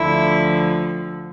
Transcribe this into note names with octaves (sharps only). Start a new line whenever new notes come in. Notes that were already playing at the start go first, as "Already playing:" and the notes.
Already playing: D2 D3 F3 E4